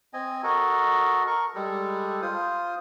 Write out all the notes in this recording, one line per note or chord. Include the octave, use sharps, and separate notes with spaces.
C4 D#5 G#5
F#4 A4 A#4 D#5
A#4 C#6
G3 G#3 A4
F4 C5 D#6